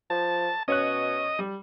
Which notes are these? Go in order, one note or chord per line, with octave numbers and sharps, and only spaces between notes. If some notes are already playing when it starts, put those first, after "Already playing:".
F3 A5
B2 C#4 C#5 D#5 F#6
G3